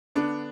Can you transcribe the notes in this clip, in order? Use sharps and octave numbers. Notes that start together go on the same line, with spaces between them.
D3 B3 D4